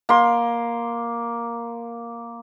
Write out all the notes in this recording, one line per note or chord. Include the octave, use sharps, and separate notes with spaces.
A#3 C6